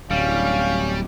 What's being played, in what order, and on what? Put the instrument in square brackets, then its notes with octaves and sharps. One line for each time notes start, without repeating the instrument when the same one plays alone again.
[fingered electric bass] D1 [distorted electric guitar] G3 [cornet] C#4 [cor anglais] F5